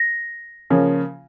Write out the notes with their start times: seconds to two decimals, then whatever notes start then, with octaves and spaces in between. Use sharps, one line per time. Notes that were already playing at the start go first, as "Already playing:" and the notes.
Already playing: A#6
0.70 C#3 F3 A#3 C#4